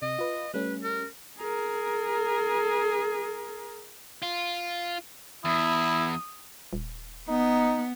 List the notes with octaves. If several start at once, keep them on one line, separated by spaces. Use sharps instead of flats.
C3 D#5
F4 B4
G3 A3 C#4 B4
A#4
G#4 A#4
F4
E2 E4 D#6
D#1
B3 D#4